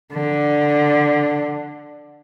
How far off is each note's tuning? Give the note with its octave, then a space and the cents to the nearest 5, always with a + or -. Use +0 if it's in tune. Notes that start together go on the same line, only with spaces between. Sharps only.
D3 +5